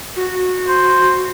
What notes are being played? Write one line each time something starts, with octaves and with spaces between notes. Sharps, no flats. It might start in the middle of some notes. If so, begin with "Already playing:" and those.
F#4
C5